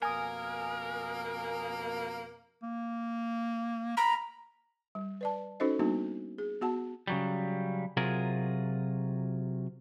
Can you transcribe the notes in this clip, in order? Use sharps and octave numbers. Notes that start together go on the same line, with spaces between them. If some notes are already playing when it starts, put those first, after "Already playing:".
F2 B2 A#3 A#4 G#5 D#6
A#3
A#5 B5
G3
B4 D5 A5
C#4 D#4 F#4 A4 C5 D#5
G3 A#3 B3 D4 D#4 F#4
G#4
B3 F#4 F#5 A5
C#3 F#3 G3
C3 F#3 F4 G#4 A#4